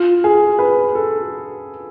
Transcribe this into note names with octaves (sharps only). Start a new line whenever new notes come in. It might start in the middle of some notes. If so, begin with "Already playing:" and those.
Already playing: F4
G#4
B4
A4